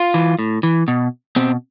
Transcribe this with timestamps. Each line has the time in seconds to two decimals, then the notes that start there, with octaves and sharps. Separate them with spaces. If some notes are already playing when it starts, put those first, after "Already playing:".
Already playing: F4
0.14 E3
0.39 A2
0.63 E3
0.88 B2
1.36 B2 C4